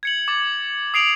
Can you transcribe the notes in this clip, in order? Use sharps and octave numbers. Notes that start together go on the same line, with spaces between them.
G#6 C#7 F#7
D6 A6
D#6 C7 D7 F7 F#7